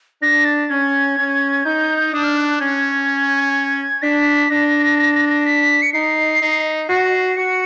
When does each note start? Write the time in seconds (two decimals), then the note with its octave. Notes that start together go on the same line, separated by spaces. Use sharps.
0.21 D4 A#6
0.45 A6
0.70 C#4 G#6
1.17 C#4
1.65 D#4 G6
2.12 D4 D#6
2.24 F6
2.36 F#6
2.48 F#6
2.60 C#4 G#6
4.02 D4 B6
4.50 D4 A#6
5.46 B6
5.82 C#7
5.93 D#4 C7
6.41 D#4
6.88 F#4 C7
7.36 F#4 C#7